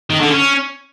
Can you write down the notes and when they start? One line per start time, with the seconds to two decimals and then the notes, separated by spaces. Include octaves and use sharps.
0.10 D#3
0.20 D3
0.31 C#4